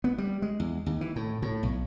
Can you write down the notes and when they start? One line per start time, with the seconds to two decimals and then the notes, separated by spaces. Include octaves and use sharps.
0.04 B3
0.18 G3
0.42 G#3
0.60 E2
0.86 D#2
1.01 E3
1.16 A2
1.42 A2
1.63 B1